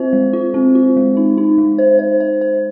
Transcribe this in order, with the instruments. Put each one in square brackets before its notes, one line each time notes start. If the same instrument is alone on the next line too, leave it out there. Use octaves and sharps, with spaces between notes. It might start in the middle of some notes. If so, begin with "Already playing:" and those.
Already playing: [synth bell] C4 F4 C5
G#3
F4
C4
F4
G#3
D#4
D#4
G#3
C5
C5
C5
C5